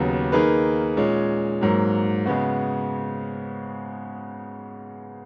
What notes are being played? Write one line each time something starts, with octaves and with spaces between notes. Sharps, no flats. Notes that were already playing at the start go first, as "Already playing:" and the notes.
Already playing: D#2 C#3 F#3 B3
D#3 A#3 D#4 G#4 B4
A#2 G#3 C#4
G#2 F#3 A#3
C#3 G#3 B3 F#4